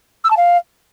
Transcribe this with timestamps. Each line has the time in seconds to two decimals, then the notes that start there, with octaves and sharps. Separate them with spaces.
0.24 E6
0.31 A5
0.37 F5